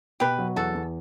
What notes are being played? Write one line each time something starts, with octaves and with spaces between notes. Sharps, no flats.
B2 G4 B4
F#3
E2 F#4 A4
E2